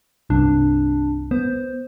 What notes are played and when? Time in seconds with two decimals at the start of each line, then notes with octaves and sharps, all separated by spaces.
0.30 C2 G2 D4
1.31 B3 C5